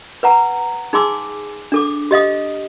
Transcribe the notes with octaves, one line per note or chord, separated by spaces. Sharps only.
B4 F#5 A#5
D#4 G#4 G#5 C6 D6 E6
D4 A4 D6
G4 D#5 F5 D#6